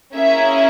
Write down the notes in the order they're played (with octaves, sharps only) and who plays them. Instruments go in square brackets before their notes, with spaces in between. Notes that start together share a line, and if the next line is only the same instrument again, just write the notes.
[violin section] A#3 C#4 E4 G#4 E5